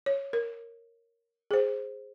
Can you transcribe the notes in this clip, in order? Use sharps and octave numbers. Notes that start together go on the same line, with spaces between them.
C#5
A#4
G#4 C5